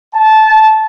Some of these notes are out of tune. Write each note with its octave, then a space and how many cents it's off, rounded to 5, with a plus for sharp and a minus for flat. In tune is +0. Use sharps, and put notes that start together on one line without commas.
A5 -15